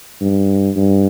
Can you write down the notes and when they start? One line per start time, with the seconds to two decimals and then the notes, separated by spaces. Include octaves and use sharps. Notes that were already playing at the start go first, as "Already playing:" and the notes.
0.21 G2
0.76 G2